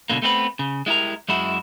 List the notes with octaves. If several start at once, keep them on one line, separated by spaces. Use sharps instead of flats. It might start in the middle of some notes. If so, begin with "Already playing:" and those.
C#2 B2 D3 A#3
A3 B3 C4 E4 B4
C#3
G#3 E4 G4 A#4
F#2 G#3 E4 F#4